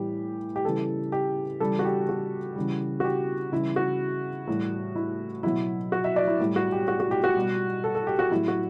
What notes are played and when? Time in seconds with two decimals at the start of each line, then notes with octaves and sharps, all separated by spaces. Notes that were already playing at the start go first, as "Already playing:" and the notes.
Already playing: A2 E3 G3 G4
0.56 G4
0.65 C#3 E3 G3 A4
1.12 G4
1.60 C#3 E3 G3 A4
1.79 F#4
1.85 G4
2.09 F#4
2.56 C#3 E3 G3
3.00 F#4
3.04 G4
3.52 C#3 E3 G3 E4
3.76 F#4
4.48 A2 E3 G3
4.95 E4
5.43 B2 F#3 E4
5.92 F#4
6.04 E5
6.16 D5
6.27 E4
6.40 A2 G3
6.56 F#4
6.72 G4
6.88 F#4
7.00 F#4
7.11 G4
7.24 F#4
7.36 B2 G3
7.84 A4
7.95 A4
8.07 G4
8.19 F#4
8.31 A2 F#3 E4
8.48 F#4